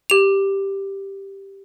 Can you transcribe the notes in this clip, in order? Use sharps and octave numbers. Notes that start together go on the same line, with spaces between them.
G4 F7